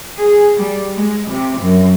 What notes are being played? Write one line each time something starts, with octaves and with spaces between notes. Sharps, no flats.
G#4
G3
G#3
C3
F#2